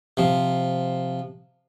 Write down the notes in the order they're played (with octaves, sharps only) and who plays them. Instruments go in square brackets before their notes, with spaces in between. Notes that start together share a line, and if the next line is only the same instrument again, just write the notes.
[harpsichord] C3 F3